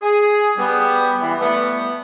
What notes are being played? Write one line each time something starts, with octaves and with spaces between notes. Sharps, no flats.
G#4
G3 B3
E3
G3 A3 B3